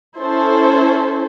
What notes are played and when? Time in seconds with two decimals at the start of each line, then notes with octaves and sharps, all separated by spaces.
0.19 C#4 E4 A4 C5